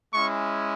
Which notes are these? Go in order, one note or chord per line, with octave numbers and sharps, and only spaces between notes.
G#3 C#4 E4 C#6